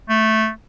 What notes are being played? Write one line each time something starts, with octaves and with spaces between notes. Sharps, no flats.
A3